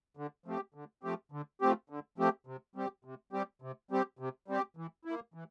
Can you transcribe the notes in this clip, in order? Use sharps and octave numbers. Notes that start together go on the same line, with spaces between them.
D3
F3 A3 C4 G4
D3
F3 A3 C4 G4
D3
F3 A3 C4 G4
D3
F3 A3 C4 G4
C3
G3 C4 G4
C3
G3 C4 G4
C3
G3 C4 G4
C3
G3 C4 G4
E3
A#3 E4
E3